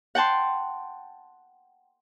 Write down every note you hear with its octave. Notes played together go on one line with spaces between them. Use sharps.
F#5 G5 A5 C6